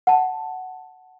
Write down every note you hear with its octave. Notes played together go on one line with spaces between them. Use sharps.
F#5 A5